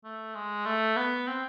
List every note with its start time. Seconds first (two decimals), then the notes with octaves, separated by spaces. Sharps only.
0.04 A3
0.35 G#3
0.66 A3
0.97 B3
1.27 C4